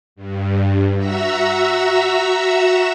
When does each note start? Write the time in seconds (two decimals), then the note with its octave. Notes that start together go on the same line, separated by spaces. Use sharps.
0.16 G2
0.96 F#4 E5 A#5 E6